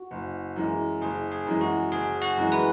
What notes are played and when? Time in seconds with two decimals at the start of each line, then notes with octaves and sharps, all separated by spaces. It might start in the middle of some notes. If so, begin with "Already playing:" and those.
Already playing: F#4
0.11 F#1
0.56 F#2 E3 G#3
1.01 F#1 G#4
1.32 G#4
1.46 F#2 E3 G#3
1.61 F#4
1.91 F#1 G#4
2.21 F#4
2.37 F#2 E3 G#3
2.52 B4